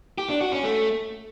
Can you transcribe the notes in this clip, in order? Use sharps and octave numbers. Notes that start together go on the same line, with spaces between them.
G4
D4
F#4
C#4
A3